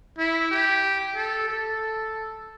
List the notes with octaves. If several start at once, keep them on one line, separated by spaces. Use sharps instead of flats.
E4
G4
A4
A4